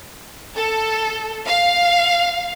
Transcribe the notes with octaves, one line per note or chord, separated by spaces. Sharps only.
A4
F5